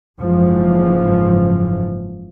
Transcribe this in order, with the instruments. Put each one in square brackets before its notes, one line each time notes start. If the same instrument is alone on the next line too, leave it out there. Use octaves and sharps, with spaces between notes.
[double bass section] F#1 G#2 E3 F3